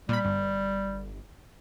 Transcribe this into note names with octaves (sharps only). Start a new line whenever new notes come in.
A#2 G3 B5
G1